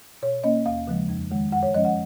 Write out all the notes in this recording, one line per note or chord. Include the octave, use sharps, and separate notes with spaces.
B2 C#5
A#3 C#4 D#5
D#2 F5
C#3 F3 G#3
F2
D#3 G#3
F#2 F#5
C#5
F3 G#3 C#4 D#5
F#5